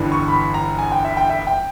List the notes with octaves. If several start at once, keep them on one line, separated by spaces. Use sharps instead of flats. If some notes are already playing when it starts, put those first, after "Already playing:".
Already playing: G1 G2 E3
C#6
B5
A#5
G#5
G5
E5
G5
E5
G5